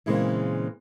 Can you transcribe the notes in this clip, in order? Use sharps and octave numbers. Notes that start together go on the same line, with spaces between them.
A#2 C#3 E3 G#3 A#3 C4